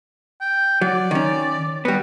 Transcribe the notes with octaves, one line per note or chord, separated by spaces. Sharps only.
G5
F#3 D5
D#3 C#4
G3 B3 F#4